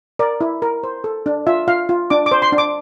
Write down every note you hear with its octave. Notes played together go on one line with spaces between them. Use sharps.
A#4 D5
E4
A#4
C5
A4
D4
F4 E5
F4 F5
F4
D4 D6
D6
C5
C6
D4
D6